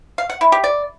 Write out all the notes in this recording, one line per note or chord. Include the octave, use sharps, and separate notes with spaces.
F5
F#5
E4
G4
D5